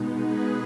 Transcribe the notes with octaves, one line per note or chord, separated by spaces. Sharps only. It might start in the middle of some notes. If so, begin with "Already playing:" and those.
Already playing: B2 G#3 B3 D#4
G#4 B4